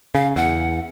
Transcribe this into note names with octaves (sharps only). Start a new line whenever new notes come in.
C#3 F5
E2 F#5